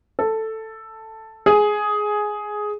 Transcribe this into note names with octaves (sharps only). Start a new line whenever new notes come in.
A4
G#4